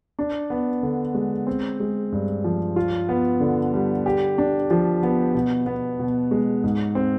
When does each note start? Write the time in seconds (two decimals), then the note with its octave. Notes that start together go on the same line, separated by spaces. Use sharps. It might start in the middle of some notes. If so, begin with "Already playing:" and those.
0.19 D4
0.50 B3
0.83 D3
1.14 G#3
1.47 C4
1.80 G#3
2.12 G2
2.44 F3
2.76 F4
3.09 B3
3.40 D3
3.74 G3
4.06 G4
4.38 D4
4.71 F3
5.03 B3
5.34 B2
5.66 B3
5.99 B2
6.31 G#3
6.64 G#2
6.95 C4